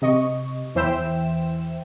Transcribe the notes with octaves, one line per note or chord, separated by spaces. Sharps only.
C3 D#5 C#6
E2 E3 C5 E5 G5 E7